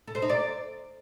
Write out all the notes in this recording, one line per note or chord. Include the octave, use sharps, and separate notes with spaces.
A4
C5
D#4
D5